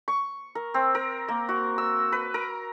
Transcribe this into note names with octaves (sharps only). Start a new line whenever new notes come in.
C#6
A#4
C4
A#4
A#3
F#4
E6
B4
A#4